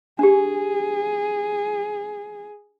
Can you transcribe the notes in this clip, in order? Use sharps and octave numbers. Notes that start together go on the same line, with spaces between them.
D4 G4 G#4